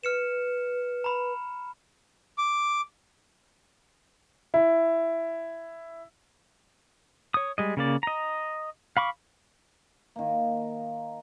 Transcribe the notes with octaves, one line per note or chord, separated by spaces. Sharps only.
B4 F6 C#7 E7
A#5 B5
D6
E4
C#5 D#6
G3 G#3 D#5
C#3 A#3 D5
D#5 A#5
F5 B5 C#6 D6
D#3 A#3